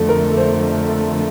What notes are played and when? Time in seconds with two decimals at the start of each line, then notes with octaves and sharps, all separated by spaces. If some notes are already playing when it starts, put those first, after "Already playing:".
Already playing: F2 D3 A3 A4
0.09 A#4
0.37 C5